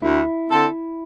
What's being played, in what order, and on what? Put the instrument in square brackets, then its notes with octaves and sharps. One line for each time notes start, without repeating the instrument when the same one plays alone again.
[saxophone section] D2 [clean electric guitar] E4
[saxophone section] D3 C4 A4